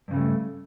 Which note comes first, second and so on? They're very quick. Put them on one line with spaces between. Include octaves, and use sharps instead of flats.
G2 C#3 G3 A3